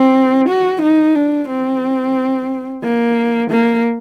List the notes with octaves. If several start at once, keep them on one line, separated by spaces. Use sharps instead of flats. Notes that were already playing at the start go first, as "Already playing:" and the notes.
Already playing: C4
F#4
D#4
D4
C4
A#3
A#3